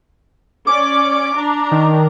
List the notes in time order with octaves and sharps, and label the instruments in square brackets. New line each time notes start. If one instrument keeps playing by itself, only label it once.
[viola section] C#4 D5 [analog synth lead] D6
[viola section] D4 A#5
[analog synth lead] D#3